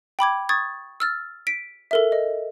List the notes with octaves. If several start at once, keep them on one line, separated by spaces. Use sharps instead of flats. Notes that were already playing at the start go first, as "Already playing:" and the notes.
G5 B5 D6 G#6
C#6 D#6 G#6 A6
E6 F6 A6
B6 D7
A4 A#4 E5
D#5